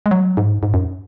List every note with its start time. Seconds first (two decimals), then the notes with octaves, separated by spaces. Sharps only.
0.06 G#3
0.11 F#3
0.37 G#2
0.63 G#2
0.74 F#2